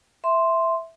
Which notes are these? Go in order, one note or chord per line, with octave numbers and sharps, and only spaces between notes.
E5 C6